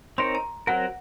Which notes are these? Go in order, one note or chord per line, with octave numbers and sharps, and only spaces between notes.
C4 D#4 A#4 C#5 C6
A#5
F#3 C4 F#4 A#4 F#5